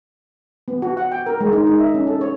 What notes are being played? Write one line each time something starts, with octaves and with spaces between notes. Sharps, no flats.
B3
F#4
F#5
G5
A#4
G#3
D#4
D#4
E5
C#4
A4
C#5